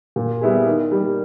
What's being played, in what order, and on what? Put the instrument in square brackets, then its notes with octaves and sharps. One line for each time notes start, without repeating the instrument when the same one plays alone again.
[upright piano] A#2
G3 B3 E4 G#4
D#3
G3 A#3